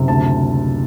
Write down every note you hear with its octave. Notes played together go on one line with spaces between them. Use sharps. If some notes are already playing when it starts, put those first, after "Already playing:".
Already playing: F#1 C3
D2 A5